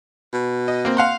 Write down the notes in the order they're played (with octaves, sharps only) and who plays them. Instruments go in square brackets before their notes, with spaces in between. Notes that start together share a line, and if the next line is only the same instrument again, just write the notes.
[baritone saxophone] B2
[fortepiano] D#5
A#3 C4
F5 F#5 C6